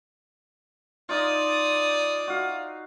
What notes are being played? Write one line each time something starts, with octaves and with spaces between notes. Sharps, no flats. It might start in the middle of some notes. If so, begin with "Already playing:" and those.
D#4 F4 D5 D#6
F#4 F5